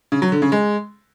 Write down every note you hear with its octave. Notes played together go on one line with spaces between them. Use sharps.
C#3
F#3
D3
C#3
G#3